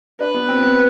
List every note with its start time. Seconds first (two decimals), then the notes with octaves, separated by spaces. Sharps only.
0.20 D4 B4
0.34 B3
0.49 C4
0.58 B3
0.62 C4